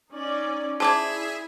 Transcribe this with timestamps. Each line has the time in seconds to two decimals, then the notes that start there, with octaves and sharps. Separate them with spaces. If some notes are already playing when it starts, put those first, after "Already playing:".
0.11 C#4 D#4 D5
0.80 E4 G#4 C5 D5 E5 A5 G#6